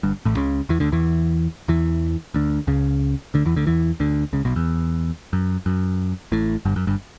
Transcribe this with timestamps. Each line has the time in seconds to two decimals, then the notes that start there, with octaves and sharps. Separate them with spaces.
0.03 G1 G2
0.25 A1 A2
0.37 C#2 C#3
0.69 E2 E3
0.80 D2 D3
0.92 E2 E3
1.68 E2 E3
2.34 D2 D3
2.67 C#2 C#3
3.34 D2 D3
3.46 E2 E3
3.56 D2 D3
3.67 E2 E3
4.00 D2 D3
4.33 C#2 C#3
4.45 B1 B2
4.56 E2
5.33 F#2
5.66 F#2
6.32 A1 A2
6.65 G1 G2
6.76 F#2
6.87 G1 G2